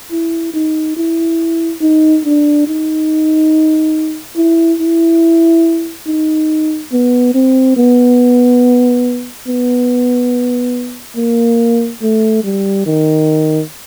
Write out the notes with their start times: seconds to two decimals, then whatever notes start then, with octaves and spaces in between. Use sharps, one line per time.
0.12 E4
0.54 D#4
0.97 E4
1.81 D#4
2.25 D4
2.67 D#4
4.36 E4
4.80 E4
6.07 D#4
6.92 B3
7.34 C4
7.77 B3
9.47 B3
11.16 A#3
12.02 A3
12.44 G3
12.86 D#3